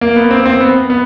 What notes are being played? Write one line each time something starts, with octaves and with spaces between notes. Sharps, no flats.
A#3
B3
C4
C4
B3
B3